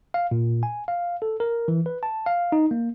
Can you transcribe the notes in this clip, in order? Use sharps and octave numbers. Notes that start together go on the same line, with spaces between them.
F5
A#2
G#5
F5
A4
A#4
E3
B4
A5
F5
D#4
A#3